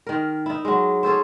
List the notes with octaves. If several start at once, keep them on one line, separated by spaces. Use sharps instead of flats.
D#3 A#4
D#4 E4
F#3 G#3
C#4 G#4 A4 C5